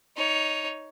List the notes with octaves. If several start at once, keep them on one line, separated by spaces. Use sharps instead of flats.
D#4 C#5